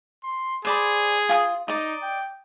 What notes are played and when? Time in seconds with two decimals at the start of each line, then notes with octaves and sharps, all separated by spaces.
0.24 C6
0.65 G#4 C5 D5 B5
1.29 F4 G#5 D#6
1.68 D#4 D5 D#5
2.03 G5